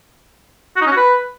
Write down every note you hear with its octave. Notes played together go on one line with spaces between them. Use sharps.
F#4
D#4
C#4
F#4
B4